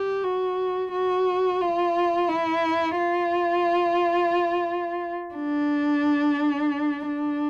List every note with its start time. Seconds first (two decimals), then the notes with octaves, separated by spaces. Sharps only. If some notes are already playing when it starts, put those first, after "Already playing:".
Already playing: G4
0.24 F#4
0.92 F#4
1.61 F4
2.29 E4
2.97 F4
5.35 D4
7.06 D4